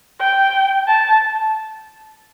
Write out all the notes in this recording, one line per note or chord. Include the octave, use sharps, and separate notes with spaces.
G5
A5